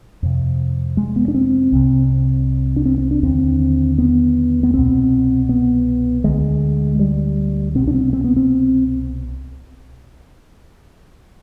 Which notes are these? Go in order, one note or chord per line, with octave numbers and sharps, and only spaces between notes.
F2 C3
G#3
B3
D4
C4
C2 C3
D4
C4
C4
D4
D#2 D3 C4
B3
B3
C2 B2 C4
B3
D2 D3 G#3
G3
C2 B2 C4
D4
C4
C4
B3
C4